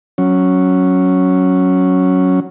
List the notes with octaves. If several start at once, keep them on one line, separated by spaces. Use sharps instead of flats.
F#3 C#4